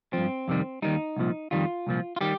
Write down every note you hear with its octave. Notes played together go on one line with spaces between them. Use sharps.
G2 F3 C4
F2 C3 D#3 G3
D#2 D#3 G3 D#4
C2 A#2 F3
F2 D#3 G3 F4
C2 A#2 F3
F4
D#3 G3 G4